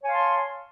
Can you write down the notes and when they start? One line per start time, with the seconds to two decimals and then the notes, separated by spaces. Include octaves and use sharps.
0.01 C#5
0.04 G#5
0.07 F5
0.10 C6
0.13 A5